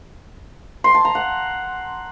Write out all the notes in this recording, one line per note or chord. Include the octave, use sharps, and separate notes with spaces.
C6
A5
A#5
F#5